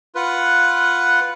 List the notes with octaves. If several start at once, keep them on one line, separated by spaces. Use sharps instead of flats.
F4 B4 F#5